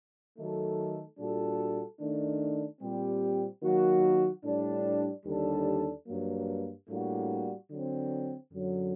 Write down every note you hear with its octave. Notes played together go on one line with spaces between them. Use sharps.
D#3 F#3 A3 D#4 A4
A#2 G3 D4 F#4 A4
D#3 A3 D4
A#2 G3 C4 G4
D#3 F#3 A#3 F#4
A2 G3 D4
D#2 D3 G3 D4 A4
G2 F#3 A#3
A2 G3 A#3 D4 F#4
D3 F#3 C4
F#2 D3 F#3